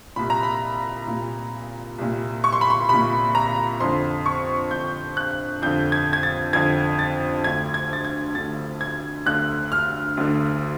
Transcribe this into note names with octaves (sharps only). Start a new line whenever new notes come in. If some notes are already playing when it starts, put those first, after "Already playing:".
C2 A#2 B5
A#5
B5
C2 A#2
C2 A#2
C#6
C6
B5
C6
C2 A#2 B5
A#5
F2 D3 C6
C#6
F2 D3 G6
F#6
F2 D3 G6
G#6
G#6
A6
F2 D3 G#6
A6
D2 D3 G#6
G#6
A6
G#6
D2 D3 A6
G#6
D2 D3 F#6
F6
D2 D3